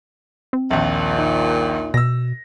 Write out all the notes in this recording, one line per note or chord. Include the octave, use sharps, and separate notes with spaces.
C4
A#1 D#2 A#2
D#4
B2 E6 A#6